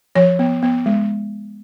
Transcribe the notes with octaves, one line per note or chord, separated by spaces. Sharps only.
F3 C#5
B3
B3
G#3